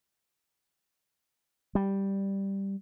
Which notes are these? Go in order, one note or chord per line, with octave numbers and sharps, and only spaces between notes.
G3